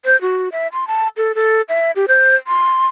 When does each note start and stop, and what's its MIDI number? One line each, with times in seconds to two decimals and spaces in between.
0.05 0.19 72
0.21 0.49 66
0.52 0.67 76
0.73 0.87 84
0.88 1.08 81
1.17 1.32 69
1.35 1.62 69
1.69 1.91 76
1.96 2.06 67
2.08 2.36 72
2.47 2.88 84